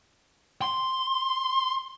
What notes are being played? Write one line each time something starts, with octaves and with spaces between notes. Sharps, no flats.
C6